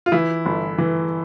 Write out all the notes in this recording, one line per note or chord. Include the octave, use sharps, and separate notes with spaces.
F4
E3 E4
G1
E3